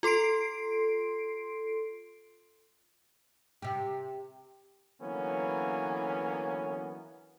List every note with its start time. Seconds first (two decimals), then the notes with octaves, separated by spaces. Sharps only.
0.03 F4 A4 C6 C7 D7
3.62 C3 G4
5.00 D3 E3 F#3 A#3 B3 C#4